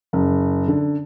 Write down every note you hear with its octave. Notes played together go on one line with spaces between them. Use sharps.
F#1
D3